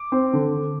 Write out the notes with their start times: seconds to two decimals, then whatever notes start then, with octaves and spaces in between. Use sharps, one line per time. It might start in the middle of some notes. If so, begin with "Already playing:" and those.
Already playing: D6
0.12 C4
0.33 D3